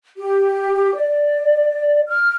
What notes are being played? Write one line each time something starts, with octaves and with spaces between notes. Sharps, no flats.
G4
D5
F6